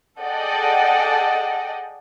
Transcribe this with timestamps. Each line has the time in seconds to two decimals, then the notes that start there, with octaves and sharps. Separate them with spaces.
0.21 G#4 A4 D5 D#5 F#5 G5